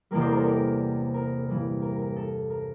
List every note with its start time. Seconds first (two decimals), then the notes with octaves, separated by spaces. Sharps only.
0.11 E2 C3 E3 G3 A#3 A#4 D5
0.20 A4 C5
0.29 A#4
0.37 A4 C5
0.45 A#4 D5
1.14 A#4
1.49 G2 E3 G3 A#3
1.82 A#4
1.99 A#4
2.16 A4
2.50 A#4